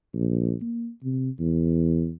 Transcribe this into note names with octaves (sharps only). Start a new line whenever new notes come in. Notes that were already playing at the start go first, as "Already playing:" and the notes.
A#1
A#3
C3
E2